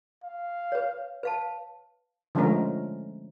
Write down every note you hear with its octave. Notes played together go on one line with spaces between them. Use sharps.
F5
B4 C#5
B4 F5 A5
D3 F3 G#3 A3 C#4 A#4